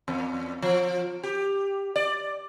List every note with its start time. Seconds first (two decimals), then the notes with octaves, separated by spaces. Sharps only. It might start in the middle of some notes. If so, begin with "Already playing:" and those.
0.08 E2
0.62 F3
1.23 G4
1.96 D5